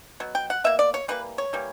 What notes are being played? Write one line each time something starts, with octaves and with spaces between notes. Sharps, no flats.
B2 F#3
G5
F#5
B2 A#3 E5
D5
C#5
E3 G3 A#3 B4
C#5
E3 G3 A#3